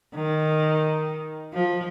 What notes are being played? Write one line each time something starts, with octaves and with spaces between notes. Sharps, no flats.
D#3
F3